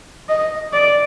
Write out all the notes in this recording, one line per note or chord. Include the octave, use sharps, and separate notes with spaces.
D#5
D5